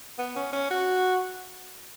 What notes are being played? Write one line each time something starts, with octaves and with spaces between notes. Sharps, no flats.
B3
C#4
C#4
F#4